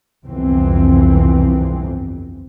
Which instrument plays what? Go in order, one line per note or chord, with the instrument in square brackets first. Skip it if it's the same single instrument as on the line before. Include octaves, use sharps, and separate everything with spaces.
[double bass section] G1 C2 F2 E3 C4